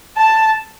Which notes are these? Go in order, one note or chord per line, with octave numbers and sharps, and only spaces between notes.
A5